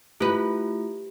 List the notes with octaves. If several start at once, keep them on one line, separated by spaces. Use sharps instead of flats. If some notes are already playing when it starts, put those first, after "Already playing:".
A3 E4 F4 G4 B4